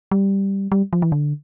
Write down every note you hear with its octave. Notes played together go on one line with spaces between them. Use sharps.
G3
G3
F3
E3
D3